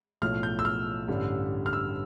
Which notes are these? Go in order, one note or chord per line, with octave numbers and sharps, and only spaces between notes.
B1 A2 F3 A3 F6
G6
E6
F6
A1 G2 D3 G3
F6
E6